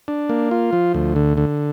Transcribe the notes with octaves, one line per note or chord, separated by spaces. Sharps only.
D4
A#3
F4
F3
D2
D3
D3